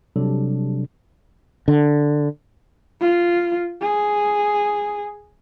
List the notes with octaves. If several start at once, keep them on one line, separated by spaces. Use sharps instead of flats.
C3 F#3 G3 D4 A4
D3
F4
G#4